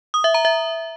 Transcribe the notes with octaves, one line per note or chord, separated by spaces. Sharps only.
D#6
E5
A#5
E5